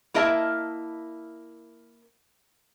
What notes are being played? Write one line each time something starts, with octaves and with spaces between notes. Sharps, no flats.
A#3 E4 A#4 D#5 E5 A5